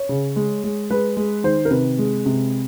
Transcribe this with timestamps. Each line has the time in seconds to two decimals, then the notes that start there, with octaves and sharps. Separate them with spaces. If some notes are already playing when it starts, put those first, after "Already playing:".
Already playing: C#5
0.09 C#3
0.36 G#3
0.64 G#3
0.91 G#3 B4
1.17 G#3
1.44 D#3 C5
1.65 A#4
1.71 C3 B4
1.99 G#3
2.26 C3